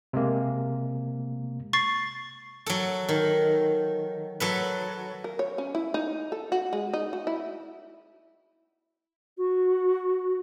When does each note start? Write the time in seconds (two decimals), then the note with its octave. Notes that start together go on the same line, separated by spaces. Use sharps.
0.13 C3 G#3 A#3
1.73 C#6 A6 C7
2.66 F#3 A4
3.08 D#3
4.40 F#3 A4 B4
5.24 A#4
5.39 C#5
5.58 C#4
5.75 E4
5.94 D#4
6.32 A4
6.52 F#4
6.73 G#3
6.93 D#4
7.13 F#4
7.27 E4
9.37 F#4